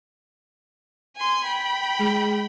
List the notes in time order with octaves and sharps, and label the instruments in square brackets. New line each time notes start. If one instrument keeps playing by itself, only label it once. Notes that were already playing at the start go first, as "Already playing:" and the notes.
[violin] G#5 C6
G5 B5
[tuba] G#3